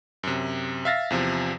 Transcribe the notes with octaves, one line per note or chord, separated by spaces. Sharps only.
F#2 C3
E5 F5 A6 A#6
E2 C3 F3